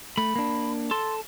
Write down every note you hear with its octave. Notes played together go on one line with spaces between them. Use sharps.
A3 B5
A#3 D4
A4 C6